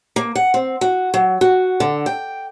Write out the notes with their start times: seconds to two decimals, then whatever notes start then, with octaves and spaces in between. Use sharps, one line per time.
0.16 A#3
0.35 F#5
0.54 C4
0.81 F#4
1.14 F#3
1.41 F#4
1.80 D3
2.06 G5